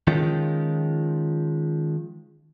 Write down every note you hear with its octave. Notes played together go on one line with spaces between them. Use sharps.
D#3 F3 G#3 C#4 F4